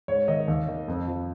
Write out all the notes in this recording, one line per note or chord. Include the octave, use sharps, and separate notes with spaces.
G#2 C#5
D#3 D#5
D#2
D#3
F2
F3